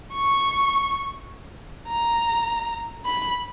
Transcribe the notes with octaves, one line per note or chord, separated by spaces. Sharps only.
C#6
A#5
B5